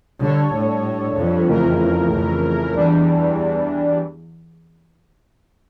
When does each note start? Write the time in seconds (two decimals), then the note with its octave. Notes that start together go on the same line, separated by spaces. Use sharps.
0.21 D3 G3 D4 A4 C#5
0.53 A2
1.16 F2
1.48 C#3 E3 A3 E4 A#4
2.12 F2
2.75 E2 E3 G3 D4